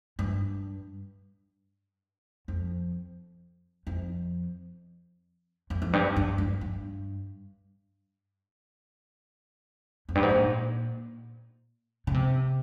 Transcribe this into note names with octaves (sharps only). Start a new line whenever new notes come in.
G2
F2
F2
F2
F2
G2
G2
G2
G2
F2
G2
G#2
A#2
C#3
C3